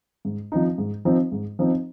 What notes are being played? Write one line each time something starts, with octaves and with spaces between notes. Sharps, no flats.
G#2
F3 C4 D#4
G#2
F3 C4 D#4
G#2
F3 C4 D#4